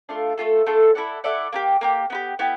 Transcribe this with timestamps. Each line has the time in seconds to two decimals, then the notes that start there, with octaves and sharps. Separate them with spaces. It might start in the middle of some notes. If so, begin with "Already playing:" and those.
0.09 A3 D4 F4
0.38 A3 D4 F4 A4
0.66 A3 D4 F4 A4
0.95 E4 A4 D5 F#5
1.24 E4 A4 D5 F#5
1.52 A#3 D4 G4
1.81 A#3 D4 G4
2.10 B3 E4 G4
2.39 B3 E4 G4